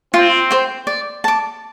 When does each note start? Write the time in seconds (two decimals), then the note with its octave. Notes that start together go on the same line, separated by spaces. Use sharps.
0.14 C4 F4
0.51 C5 G5
0.87 D5
1.24 A5 D6